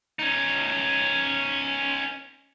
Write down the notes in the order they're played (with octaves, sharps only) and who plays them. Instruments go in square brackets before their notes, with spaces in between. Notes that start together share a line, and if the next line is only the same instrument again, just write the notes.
[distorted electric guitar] C#4 D#4